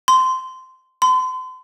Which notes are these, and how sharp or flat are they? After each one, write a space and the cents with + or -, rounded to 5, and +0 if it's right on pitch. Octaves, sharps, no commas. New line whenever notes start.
C6 -15
C6 -40